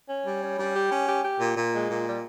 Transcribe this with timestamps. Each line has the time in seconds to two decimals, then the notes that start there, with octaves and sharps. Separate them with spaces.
0.09 C#4
0.27 G3
0.43 C#4
0.59 G3
0.76 G4
0.92 C#4
1.08 G4
1.24 G4
1.40 A#2
1.57 A#2
1.74 G#3
1.90 A#2
2.06 G3